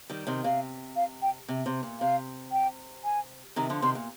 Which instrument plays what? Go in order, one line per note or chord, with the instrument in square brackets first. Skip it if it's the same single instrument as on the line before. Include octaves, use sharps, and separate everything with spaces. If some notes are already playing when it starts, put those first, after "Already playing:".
[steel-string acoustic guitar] D#3 G3
C3 D#3
[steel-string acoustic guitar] C3 [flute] F5
[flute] F5
G5
[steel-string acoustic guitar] C3
C3
A#2
[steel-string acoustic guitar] C3 [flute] F5
[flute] G5
G#5
[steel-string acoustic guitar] C3 D#3 [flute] A#5
[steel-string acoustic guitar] D3 F3
[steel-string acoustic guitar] C3 D#3 [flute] C6
[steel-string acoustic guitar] A#2